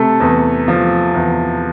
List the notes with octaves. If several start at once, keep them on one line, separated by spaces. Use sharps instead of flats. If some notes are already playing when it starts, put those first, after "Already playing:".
Already playing: C3 A3 A4
E2
F3
E2